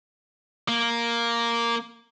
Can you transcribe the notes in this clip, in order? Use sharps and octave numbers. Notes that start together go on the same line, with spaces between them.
A#3